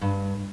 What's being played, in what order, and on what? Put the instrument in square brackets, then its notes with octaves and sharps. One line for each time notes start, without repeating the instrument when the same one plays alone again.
[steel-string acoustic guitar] G2